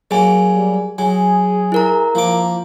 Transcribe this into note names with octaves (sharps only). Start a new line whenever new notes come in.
F#3 A#3 G#4 G#5
G3
F#3 G#4 G#5
E4 A#4 A#5
F3 A#3 D6